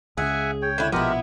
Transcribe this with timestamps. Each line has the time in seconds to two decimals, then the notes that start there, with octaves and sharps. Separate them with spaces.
0.17 C#2 C#3 G#4 E5 F#5 G#5
0.62 C#5 G5
0.78 D3 E4
0.92 A#1 B2 F3 G#3 B3 E4 G4 A#4